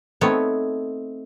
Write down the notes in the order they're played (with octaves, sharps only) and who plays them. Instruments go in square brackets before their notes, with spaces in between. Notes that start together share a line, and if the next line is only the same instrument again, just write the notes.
[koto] A3 B3 C4 D#4 C#5